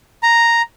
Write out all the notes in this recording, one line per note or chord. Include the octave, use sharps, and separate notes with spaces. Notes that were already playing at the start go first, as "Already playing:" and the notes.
A#5